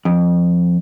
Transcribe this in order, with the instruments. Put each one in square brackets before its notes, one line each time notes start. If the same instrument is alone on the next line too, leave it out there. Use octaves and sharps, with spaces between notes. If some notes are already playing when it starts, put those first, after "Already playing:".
[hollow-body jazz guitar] F2